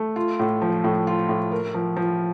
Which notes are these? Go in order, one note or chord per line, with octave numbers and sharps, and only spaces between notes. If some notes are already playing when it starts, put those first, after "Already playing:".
Already playing: A3
F4
A2
F3
A2
F4
A2
A#4
F3
F3